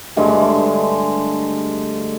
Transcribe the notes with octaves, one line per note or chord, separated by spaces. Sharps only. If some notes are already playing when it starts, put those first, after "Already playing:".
G2 D3 G#3 A3